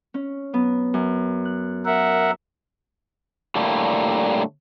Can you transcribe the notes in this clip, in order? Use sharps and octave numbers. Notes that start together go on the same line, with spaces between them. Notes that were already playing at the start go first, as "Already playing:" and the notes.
C#4
F#3 B3
F#2
F#6
A#4 E5 F#5
A2 D3 G3 A3 A#3